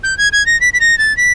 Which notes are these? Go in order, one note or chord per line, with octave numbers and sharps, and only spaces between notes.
G6
G#6
G#6
A#6
B6
B6
A#6
A6
B6